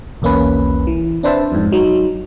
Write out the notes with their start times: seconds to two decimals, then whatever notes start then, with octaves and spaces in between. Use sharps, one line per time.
0.22 B1 E2 A#3 C#4 B4
0.87 E3
1.23 C4 D4 B4 C5 E5 A5
1.52 F2 G#2
1.72 F#3 D#4